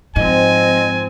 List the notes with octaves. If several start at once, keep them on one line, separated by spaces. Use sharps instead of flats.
G#2 F3 C4 D#5 G#5